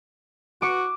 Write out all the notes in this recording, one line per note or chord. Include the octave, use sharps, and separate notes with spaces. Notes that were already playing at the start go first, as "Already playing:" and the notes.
F#4 D6 C#7